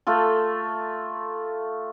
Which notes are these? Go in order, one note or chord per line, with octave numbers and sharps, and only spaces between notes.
A3 F4 A4